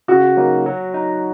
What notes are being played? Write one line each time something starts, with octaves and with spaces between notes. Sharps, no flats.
C#3 F#4
F#3 A#3 D#4
F#3
D#4